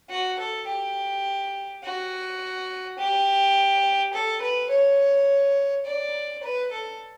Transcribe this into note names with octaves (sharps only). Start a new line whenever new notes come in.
F#4
A4
G4
F#4
G4
A4
B4
C#5
D5
B4
A4